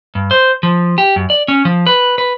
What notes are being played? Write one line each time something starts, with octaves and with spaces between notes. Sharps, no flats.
G2
C5
F3
G4
F#2
D5
C#4
F3
B4
B4